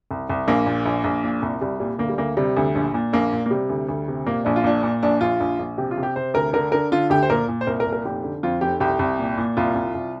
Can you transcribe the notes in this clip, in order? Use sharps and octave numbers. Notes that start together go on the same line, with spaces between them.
C2
C2
A#1 A#3
A#2
A#1
A#1
A#2
C2
C2 G3
A#2 G3
D2 A#3
G3
D2 A#3
C3 G3
D2
A#1
A#2
A#1 A#3
A#2
A#3
C3 G3
D2
D2
C3
A#2 A#3
A#1 D4
F4
A#2 D4
A#2
A#1 D4
A#1 F4
A#1
A#1
C3 G4
F4
C3
G4
C3 C5
D2 A#4
D3 A#4
D3 A#4
D3 F4
D2 G4
C5
A#2 A#4
A#2
C5
C2 A#4
A#4
A#2
A#4
F1 G4
D3
F2 F4
F1 G4
C2 G4
C2
A#2
A#2
C2 F4
C2
C2